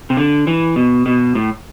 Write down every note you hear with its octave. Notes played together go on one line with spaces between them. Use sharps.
C3
D3
E3
B2
B2
A2